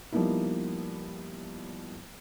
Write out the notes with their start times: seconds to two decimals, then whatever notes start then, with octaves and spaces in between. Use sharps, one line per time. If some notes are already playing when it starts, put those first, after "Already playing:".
0.12 F3 G3 A#3 B3 D#4 E4